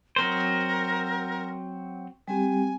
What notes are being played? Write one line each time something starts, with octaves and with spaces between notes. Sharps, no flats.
F#3 C4 A#4 C5
G3 C4 G4 G#5